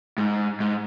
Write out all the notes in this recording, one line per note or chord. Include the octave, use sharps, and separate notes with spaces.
G#2
G#2